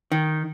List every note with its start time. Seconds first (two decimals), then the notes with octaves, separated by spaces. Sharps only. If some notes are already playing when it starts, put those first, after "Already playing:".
0.12 D#3